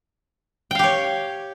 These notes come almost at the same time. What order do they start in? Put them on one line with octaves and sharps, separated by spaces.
G5 F5 G4 C#5